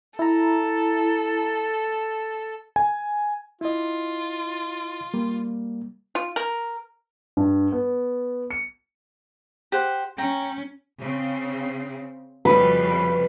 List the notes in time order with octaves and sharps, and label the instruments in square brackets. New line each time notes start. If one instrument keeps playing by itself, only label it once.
[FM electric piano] E4 A#5 [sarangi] A4
[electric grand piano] G#5
[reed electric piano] E4 D#5 [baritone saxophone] F4
[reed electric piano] G3 A#3
[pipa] F4
A#4
[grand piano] G2
B3
C#7
[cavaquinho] G4 C5 F#5
[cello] C#4 [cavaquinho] G5 A#5
[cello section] C#3 C4
[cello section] F2 C#3 G3 [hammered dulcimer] B4